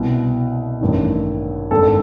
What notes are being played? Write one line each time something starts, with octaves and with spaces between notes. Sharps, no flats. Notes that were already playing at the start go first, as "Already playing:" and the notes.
Already playing: C2 B2
A1 G2 D#3
G#1 G2 D#3 A4